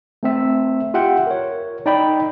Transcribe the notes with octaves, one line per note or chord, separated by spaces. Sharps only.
A3 C4 E5
F4 G4 E5 F#5 G5
A#4 C#5
D#4 D5 G5 B5